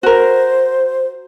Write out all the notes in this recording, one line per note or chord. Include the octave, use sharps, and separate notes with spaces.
F#4 A#4 C5